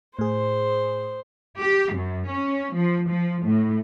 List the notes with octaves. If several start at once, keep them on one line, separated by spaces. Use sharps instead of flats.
A2 G#4 C5
G4
F#2
C#4
F3
F3
A2